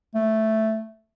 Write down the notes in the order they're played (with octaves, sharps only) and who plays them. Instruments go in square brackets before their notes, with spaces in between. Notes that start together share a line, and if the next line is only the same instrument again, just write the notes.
[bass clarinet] A3